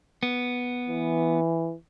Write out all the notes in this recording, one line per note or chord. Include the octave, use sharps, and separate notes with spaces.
B3
E3